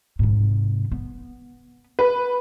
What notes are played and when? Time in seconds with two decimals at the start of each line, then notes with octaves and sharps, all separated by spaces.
0.19 G#2 C3
0.92 B3
1.99 B4